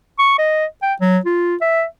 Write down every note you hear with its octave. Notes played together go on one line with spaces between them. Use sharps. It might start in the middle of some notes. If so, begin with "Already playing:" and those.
C#6
D#5
G5
F#3
F4
E5